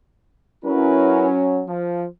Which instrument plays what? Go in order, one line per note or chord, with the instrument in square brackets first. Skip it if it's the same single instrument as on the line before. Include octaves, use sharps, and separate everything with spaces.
[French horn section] F#3 C#4 [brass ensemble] E4 A#4 B4
[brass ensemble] F3